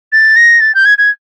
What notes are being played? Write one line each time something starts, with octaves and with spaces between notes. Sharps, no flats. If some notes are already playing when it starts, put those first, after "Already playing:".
A6
A#6
A6
G6
G#6
G#6